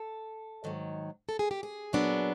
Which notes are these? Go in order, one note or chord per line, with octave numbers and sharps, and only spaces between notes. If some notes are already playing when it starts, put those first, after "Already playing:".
Already playing: A4
G#2 D#3 F#3
A4
G#4
G4
G#4
A#2 F#3 B3 D4